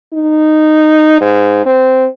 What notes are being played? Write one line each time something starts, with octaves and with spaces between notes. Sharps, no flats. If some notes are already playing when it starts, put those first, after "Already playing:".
D#4
G#2
C4